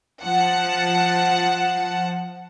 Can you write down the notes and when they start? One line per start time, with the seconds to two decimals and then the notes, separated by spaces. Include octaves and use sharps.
0.24 F3 F#5 A5